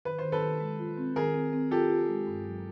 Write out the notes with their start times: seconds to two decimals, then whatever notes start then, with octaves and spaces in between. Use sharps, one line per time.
0.05 D#3 B4
0.18 C5
0.24 D#3
0.32 A4 B4
0.42 D#3
0.60 G#3
0.79 F4
0.98 C4
1.16 D#3 G#4 A#4
1.34 C4
1.53 C4
1.71 F4 G4 A4
1.90 F4
2.08 G#3
2.27 G2
2.45 F#3